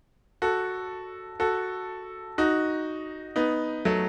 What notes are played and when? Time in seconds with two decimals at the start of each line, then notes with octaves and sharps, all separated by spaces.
0.42 F#4 A4
1.40 F#4 A4
2.38 D#4 F#4
3.36 B3 D#4
3.85 F#3 A3